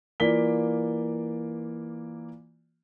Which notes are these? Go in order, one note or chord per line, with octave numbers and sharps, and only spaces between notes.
E3 A#3 F4 D5 B6 G7